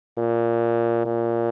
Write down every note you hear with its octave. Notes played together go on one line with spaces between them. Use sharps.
A#2
A#2